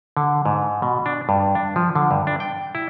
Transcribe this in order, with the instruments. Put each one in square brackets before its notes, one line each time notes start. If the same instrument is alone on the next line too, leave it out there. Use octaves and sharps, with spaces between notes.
[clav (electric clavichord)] D3
G#2
B2
D4
G2
D4
F3
D3
G2
D4
G5
E4